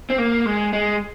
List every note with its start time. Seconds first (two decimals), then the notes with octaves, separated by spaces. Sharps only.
0.10 C4
0.18 A#3
0.46 G#3
0.73 G#3